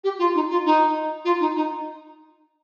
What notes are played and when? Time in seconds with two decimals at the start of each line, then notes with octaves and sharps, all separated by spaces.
0.04 G4
0.19 F4
0.35 D#4
0.50 F4
0.65 D#4
1.25 F4
1.40 D#4
1.56 D#4